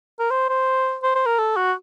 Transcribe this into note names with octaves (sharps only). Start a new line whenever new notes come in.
A#4
C5
C5
C5
C5
A#4
A4
F#4